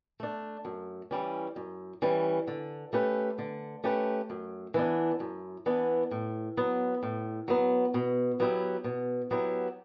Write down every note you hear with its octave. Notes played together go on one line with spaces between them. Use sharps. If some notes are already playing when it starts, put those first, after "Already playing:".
A3 D4
F#2
E3 G3 C#4
F#2
E3 G3 C#4
D3
A3 C#4 G4 B4
D3
A3 C#4 G4 B4
F#2
E3 B3 D4
F#2
E3 B3 D4
A2
F#3 B3
A2
F#3 B3
B2
F#3 B3 E4 G4
B2
F#3 B3 E4 G4